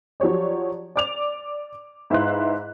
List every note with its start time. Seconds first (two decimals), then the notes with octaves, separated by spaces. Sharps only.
0.20 F3 F#3 G4 C#5 D5
0.96 D5 D6 F7
2.10 G#2 E4 B4 F5 C6 F#6